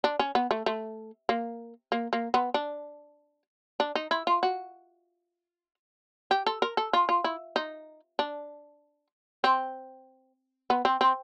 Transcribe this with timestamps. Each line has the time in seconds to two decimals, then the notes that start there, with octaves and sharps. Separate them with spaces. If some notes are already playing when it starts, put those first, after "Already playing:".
0.04 D4
0.19 C#4
0.35 B3
0.51 A3
0.66 A3
1.29 A#3
1.92 A#3
2.13 A#3
2.34 B3
2.54 D4
3.80 D4
3.95 D#4
4.11 E4
4.27 F4
4.43 F#4
6.31 G4
6.46 A4
6.62 A#4
6.77 A4
6.93 F4
7.09 F4
7.24 E4
7.56 D#4
8.19 D4
9.44 C4
10.70 B3
10.85 C4
11.01 C4